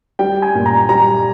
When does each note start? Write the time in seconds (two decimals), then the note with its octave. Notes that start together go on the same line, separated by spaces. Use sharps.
0.19 G3 G5
0.42 G#5
0.55 A#2
0.66 A#5
0.89 G3 A#5